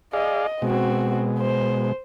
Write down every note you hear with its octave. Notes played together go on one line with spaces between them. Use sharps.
G#4 D5 D#5 F5
B2 G#3 C4 F#4
C5